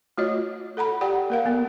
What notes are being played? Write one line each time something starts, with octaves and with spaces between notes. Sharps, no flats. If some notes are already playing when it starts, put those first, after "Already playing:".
A3 F4 F#4 C#5 D#5
A4 F#5 A#5 B5
G4 D5 F#5 G5
A#3 A#4 F5
A#3 B3